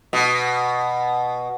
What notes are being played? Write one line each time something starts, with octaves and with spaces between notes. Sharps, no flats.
B2